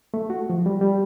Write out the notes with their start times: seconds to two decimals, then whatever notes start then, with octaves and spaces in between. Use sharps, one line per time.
0.14 A3
0.30 F#4
0.50 F3
0.66 G3
0.81 G3